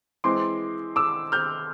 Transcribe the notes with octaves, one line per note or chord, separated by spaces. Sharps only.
E3 G#3 C4 C6 D6
D6 E6
F6 G6